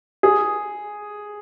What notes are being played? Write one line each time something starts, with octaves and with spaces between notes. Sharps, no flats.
G#4